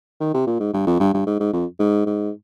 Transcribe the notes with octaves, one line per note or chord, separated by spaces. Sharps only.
D#3
C3
A#2
G#2
G2
F2
G2
G2
G#2
G#2
F2
G#2
G#2